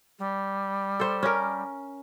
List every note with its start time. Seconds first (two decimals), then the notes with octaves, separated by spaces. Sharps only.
0.19 G3
1.00 A4 C5
1.23 C#4 A#4